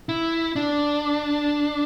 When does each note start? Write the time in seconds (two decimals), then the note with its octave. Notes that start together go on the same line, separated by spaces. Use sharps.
0.09 E4
0.56 D4